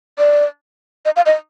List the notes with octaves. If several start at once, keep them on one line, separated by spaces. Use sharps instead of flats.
D5
D#5
F5
D#5